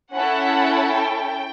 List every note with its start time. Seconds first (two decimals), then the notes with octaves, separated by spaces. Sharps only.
0.14 C#4 E4 A4 F#5
0.90 G5